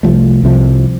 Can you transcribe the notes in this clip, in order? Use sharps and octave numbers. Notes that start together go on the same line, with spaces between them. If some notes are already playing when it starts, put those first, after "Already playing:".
C2 C3 F3 A3
C2 C3 F3